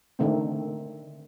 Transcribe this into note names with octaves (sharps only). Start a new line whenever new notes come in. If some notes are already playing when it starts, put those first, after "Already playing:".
D3 D#3 A3 C4